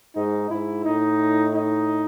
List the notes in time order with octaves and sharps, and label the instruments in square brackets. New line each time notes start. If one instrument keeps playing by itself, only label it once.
[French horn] G#2 [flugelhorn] D#4
[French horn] G#2 [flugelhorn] E4
[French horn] A2 [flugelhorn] D#4
[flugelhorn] D#4